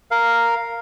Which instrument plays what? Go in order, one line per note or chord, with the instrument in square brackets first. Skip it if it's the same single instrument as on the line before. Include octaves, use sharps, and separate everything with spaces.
[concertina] A#4 F5